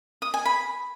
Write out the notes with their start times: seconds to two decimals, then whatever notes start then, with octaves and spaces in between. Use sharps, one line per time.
0.22 D#6
0.34 G#5
0.45 B5